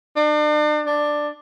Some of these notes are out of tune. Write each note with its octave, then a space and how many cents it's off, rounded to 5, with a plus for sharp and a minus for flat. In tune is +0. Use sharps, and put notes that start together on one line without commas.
D4 +40
D4 +10